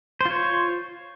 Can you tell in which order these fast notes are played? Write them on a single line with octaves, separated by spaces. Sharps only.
C5 F4 C#5